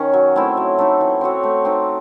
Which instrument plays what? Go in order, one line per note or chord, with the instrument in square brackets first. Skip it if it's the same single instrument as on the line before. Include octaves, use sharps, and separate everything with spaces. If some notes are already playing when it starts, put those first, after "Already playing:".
Already playing: [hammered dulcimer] D#3 C#4
F#3
A3 C4 E4
F#3
A3 D#4
E3
C4 F#4 C#5
A3
C4 D#4